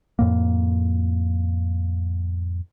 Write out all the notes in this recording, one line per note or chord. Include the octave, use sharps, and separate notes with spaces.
F2 A2 A#3